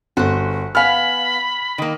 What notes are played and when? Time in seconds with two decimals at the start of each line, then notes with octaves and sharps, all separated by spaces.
0.17 G1 F#4 C5
0.75 B3 F5 G#5 B5 F6
1.78 D#3 A#3